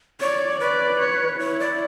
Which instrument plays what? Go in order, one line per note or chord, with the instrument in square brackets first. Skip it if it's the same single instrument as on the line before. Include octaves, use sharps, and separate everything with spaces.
[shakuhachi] C#5 [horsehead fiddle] D5
[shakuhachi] B4 [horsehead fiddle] D5
[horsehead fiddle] C#5
[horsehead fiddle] E4 [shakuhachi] C#5
[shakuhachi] D5